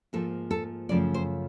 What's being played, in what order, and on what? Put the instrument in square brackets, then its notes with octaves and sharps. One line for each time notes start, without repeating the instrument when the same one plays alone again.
[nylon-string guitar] G#2 F3 A#3 A4
A4
F#2 C#3 F3 A3 D5
C5